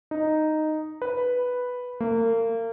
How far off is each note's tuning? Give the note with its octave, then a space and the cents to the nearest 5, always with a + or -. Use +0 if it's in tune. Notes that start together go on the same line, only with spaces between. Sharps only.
D#4 -5
B4 +0
A#3 -35